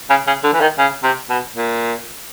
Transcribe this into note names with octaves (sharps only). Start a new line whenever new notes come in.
C#3
C#3
D3
E3
D#3
C#3
C3
B2
A#2